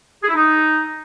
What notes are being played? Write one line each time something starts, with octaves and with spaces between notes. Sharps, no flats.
G#4
E4
D#4